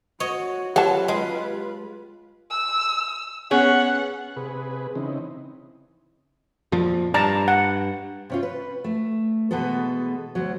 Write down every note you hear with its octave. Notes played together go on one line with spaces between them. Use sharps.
F#4 C#5 D#5
F#3 F4 G4 B4 F#5 A5
G#3
E6
B3 C#4 G#4 F#5
C3 G#4 B4
C#3 E3 C4 D#4
F2 A#2 F3
G2 D5 A5 A#5
F#5
C3 C#4 F4
B4
A3
B2 E3 G#3 B3 A4
D2 F#3